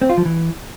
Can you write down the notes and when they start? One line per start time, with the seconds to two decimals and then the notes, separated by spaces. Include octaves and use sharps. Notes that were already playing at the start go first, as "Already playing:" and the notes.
0.02 C4
0.10 F4
0.17 F3
0.25 E3